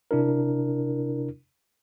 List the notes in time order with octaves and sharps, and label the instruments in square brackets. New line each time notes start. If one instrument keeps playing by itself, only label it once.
[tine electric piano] C3 D4 E4 A#4